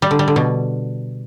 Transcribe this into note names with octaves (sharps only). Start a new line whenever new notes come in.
G3
D3
G3
D3
B2